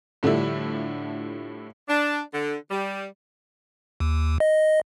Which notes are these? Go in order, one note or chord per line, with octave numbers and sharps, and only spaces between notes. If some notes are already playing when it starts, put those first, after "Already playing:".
A2 D3 F3 G3 E4
D4
D3
G3
D#2
D#5